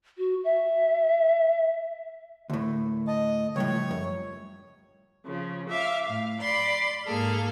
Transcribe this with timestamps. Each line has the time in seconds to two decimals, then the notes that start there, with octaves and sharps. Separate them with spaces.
0.18 F#4
0.44 E5
2.50 D2 A2 D3 A#4
3.07 D#5 A5
3.56 C#2 A2 F3 G3 C#5
3.91 F#2
5.24 C#3 F3
5.68 E5 F5 D6
6.04 A2 F5
6.39 D5 B5 C6
7.06 G#2 A#3 G#4 A4 F6